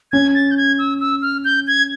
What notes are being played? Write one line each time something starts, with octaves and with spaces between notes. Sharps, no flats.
C#4 G#6
A6
G6
G#6
E6
E6
F6
G6
G#6